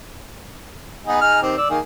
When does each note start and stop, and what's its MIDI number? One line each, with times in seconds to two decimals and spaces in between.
1.07 1.21 59
1.07 1.21 63
1.07 1.21 68
1.21 1.42 63
1.21 1.42 68
1.21 1.42 89
1.43 1.55 51
1.43 1.55 60
1.43 1.55 67
1.57 1.69 74
1.57 1.69 88
1.70 1.79 51
1.70 1.79 58
1.70 1.79 68